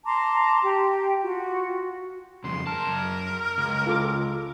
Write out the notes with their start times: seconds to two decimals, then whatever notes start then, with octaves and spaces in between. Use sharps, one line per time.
0.05 A5 A#5 C6 D6
0.63 G4 G5
1.23 F4 F#4
2.44 F2 C#3 C6
2.67 F#2 A#4 A5
3.58 C#2
3.87 F4 A4 D6